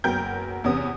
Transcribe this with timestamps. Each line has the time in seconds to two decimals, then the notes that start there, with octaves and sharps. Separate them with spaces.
0.04 F#1 F#3 B3 A#4 G5 G6
0.64 E2 C3 B3 C#4 D#6